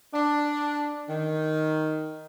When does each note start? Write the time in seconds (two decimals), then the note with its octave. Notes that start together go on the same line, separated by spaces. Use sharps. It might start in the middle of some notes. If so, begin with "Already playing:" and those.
0.14 D4
1.08 D#3